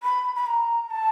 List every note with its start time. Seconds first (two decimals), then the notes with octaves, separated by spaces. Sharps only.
0.03 B5
0.36 B5
0.47 A#5
0.90 A5